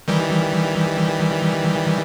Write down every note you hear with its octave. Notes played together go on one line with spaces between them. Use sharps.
D#3 E3 G3